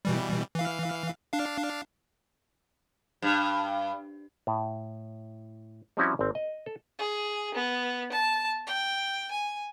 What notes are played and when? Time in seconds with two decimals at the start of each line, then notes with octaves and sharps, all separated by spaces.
0.05 B2 E3 G3
0.55 E3 F5
1.33 D4 F5
3.22 G2
4.47 A2
5.97 F3 G3 C4 C#4 E4 F#4
6.19 G#1 C4
6.35 D#5
6.66 A4
6.99 G#4
7.55 B3
8.12 A5
8.67 G5
9.31 G#5